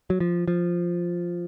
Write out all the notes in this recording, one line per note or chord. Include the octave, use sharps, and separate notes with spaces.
F#3
F3
F3